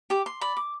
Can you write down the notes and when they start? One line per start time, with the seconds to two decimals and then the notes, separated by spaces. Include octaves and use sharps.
0.10 G4 D6
0.26 C6
0.41 D5 B5
0.57 D6